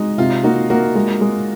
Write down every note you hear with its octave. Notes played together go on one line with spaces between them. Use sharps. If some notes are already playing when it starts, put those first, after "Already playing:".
Already playing: G#3 D#4 F#4
C3 F4
A#3 D#4 F#4
A#3 F#4 A#4
G#3
G#3